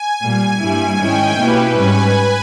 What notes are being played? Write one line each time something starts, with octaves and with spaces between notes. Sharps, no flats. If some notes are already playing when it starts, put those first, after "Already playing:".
Already playing: G#5
A#2 G3 A#3 G#5
G2 G3 A#3 E4
G#2 D#3 G#3 C#4 E4 G5
B2 A#3 C#4 E4 G4 B4
G#2 G3 C#4 G#5